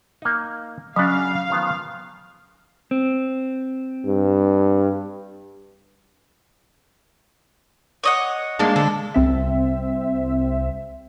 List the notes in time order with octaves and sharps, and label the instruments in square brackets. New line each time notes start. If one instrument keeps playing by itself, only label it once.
[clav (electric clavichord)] A#3 D#4
[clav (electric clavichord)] C#3 D4 F#4 [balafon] F#3 C#4 [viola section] F5
[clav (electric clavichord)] D#3 F3 B3
[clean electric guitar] C4
[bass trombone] G2
[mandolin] C#5 D#5 F#5
[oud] G#3 A#3 D4 [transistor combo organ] A5
[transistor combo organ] D3 [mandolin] A4
[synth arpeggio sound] C2 C4 E5